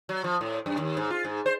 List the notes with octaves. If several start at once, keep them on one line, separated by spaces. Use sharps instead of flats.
F#3
F3
A2
F#2
D#2
G#2
F4
G#2
C5